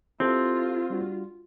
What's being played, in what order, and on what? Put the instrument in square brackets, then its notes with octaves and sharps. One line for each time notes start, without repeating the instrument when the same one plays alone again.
[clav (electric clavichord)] C4 [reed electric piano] E4 G4 A4 [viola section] F4
[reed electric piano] G3 D4 F#4